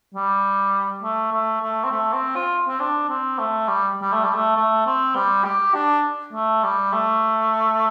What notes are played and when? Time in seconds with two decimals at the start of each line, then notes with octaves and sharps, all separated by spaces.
0.15 G3
1.03 A3
1.32 A3
1.62 A3
1.84 C4
1.91 A3
2.13 C4
2.36 F4
2.68 C4
2.80 D4
3.09 C4
3.39 A3
3.68 G3
4.02 G3
4.13 A3
4.23 G3
4.34 A3
4.56 A3
4.87 C4
5.16 G3
5.45 G4
5.75 D4
6.33 A3
6.63 G3
6.93 A3